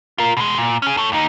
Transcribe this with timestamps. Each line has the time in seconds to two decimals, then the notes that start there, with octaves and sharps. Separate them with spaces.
0.18 F4 A#4
0.37 B2 G#3
0.58 A#2
0.82 C#4 G#4
0.97 A4 C#5
1.12 D#2 D#4